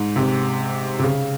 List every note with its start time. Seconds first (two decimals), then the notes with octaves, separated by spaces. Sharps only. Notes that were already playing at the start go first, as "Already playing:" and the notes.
Already playing: G#2
0.16 C3
0.99 C3
1.03 C#3